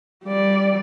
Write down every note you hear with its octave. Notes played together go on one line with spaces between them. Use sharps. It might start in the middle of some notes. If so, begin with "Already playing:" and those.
G3 D5